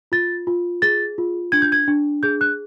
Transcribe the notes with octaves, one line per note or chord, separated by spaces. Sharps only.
F4 A6
F4
G#4 A6
F4
D4 G#6
G6
G#6
D4
G#4 G6
F#6